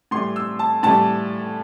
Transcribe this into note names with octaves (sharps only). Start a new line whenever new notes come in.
A2 E3 G3 C6
E6
A5
A2 E3 G3 A5